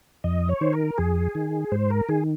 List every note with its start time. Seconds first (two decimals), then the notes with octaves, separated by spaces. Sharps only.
0.24 F2 D#5
0.49 C#5
0.61 D#3 C5
0.73 A#4
0.98 F2 G#4
1.35 D#3
1.72 G#2 C5
1.90 A#4
2.09 D#3 G#4